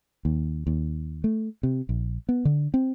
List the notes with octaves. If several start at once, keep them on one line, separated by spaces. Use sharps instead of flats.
D#2
D#2
A3
C3
A#1
B3
D3
C4